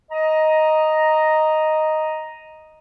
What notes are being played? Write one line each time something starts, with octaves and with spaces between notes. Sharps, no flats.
D#5 A#5